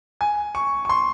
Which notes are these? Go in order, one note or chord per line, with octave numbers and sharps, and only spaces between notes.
G#5
C#6
C#6
C6